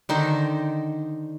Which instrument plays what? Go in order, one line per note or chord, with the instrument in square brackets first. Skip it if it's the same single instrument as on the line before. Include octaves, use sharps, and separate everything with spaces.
[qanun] D3 D#3 D#4 C5